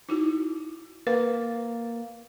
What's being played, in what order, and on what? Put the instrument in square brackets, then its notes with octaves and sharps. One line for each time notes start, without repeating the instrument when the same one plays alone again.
[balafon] D#4 E4 F#4
[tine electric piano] A#3 [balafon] B4